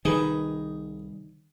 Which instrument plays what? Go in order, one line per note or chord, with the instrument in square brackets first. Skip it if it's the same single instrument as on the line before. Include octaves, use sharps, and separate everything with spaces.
[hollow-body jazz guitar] C2 D#4 B4 [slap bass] D#3 [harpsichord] G#4